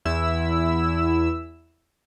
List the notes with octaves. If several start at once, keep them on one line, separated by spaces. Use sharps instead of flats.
E2 E4 E6